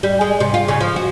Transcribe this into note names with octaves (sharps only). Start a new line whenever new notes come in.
G3
G#3
C3
F4
C#3
F3
F#4